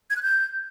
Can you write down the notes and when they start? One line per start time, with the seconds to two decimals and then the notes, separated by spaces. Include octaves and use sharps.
0.10 G#6
0.16 F#6
0.22 G6